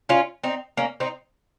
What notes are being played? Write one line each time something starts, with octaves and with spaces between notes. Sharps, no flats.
C#4 F4
C4 D#4
A#3 C#4
C4 D#4